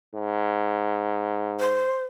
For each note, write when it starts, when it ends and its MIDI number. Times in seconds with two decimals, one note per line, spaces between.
0.15 1.88 44
1.60 2.04 72